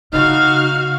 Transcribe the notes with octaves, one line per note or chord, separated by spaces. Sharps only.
C#3 F#3 D#4 F#4 F5 F6